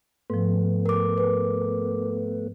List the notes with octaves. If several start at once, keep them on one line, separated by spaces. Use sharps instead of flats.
G#2 F3 A3 B3
A#4 D6
B4